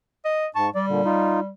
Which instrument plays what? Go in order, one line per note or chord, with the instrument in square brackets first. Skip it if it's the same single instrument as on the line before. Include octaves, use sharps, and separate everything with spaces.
[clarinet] D#5
[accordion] G#2 C#6 [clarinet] A5
[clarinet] G3 [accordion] D5
[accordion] A#2 D3
D#4 F4